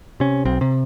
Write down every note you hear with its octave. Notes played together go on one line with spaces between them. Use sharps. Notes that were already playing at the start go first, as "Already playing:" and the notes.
C3 C#4
B1 C4
C3